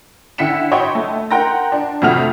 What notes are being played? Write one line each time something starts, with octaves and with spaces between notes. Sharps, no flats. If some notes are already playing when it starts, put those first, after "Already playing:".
D3 E4 G5 B6 C#7 E7
F#4 C#5 D#5 G5 B5 C6
A3
A#4 F#5 G5 A#5 C6 A#6
D4
F2 C3 A3 F#4 F6 F7